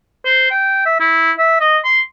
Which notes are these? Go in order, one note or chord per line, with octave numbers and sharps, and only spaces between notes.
C5
G5
E5
E4
E5
D#5
C6